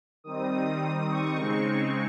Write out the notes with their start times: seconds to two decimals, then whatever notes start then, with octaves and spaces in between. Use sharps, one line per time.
0.24 D#3 G3 C4 D#4 D#6
0.52 D#6
0.80 D#6
1.08 C#6
1.37 C#3 G#3 C4 D#4